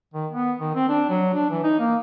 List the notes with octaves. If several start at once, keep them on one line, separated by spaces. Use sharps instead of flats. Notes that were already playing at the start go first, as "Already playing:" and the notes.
D#3
B3
D#3
C4
D4
F#3
D4
E3
D#4
A#3